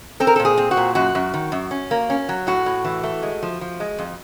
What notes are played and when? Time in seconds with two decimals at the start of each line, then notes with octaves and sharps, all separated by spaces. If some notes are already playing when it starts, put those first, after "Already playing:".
0.20 C4 A4
0.27 A#4
0.36 A4
0.40 A#2
0.45 G#4
0.58 C4
0.71 F#4
0.77 A#2
0.95 F#2 F#4
1.15 F#2
1.34 D#3
1.52 F#2
1.71 C#4
1.91 A#3
2.10 C#4
2.29 F#3
2.47 A2 F#4
2.66 A2
2.85 E3
3.03 A3
3.23 G#3
3.42 F3
3.61 F3
3.80 G#3
3.99 F2